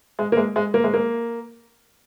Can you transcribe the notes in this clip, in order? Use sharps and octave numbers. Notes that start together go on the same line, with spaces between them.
G#3
A#3
G#3
G#3
A#3
G#3
A#3